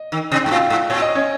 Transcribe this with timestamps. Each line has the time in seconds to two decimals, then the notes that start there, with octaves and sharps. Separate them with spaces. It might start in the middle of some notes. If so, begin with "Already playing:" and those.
Already playing: D#5
0.12 D#3
0.32 C3
0.44 G#2 G5
0.51 A#2 F4 F5
0.70 G#2
0.90 A#2 C#5
1.02 D#5
1.15 C#4 C#5